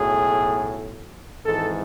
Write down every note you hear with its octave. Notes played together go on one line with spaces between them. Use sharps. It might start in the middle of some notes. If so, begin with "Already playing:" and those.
Already playing: B1 A2 F#3 G#4
G#1 G#2 E3 A4